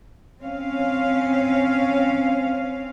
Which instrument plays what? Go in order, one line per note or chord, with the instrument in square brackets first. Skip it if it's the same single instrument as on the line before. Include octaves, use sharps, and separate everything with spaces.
[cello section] C4 C#4 F5